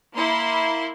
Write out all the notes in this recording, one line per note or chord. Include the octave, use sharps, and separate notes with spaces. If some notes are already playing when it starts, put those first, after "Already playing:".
A#3 E4 C6